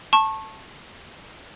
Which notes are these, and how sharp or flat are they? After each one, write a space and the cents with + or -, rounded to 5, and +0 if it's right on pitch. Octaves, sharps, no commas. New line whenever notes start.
A5 +0 C#6 -25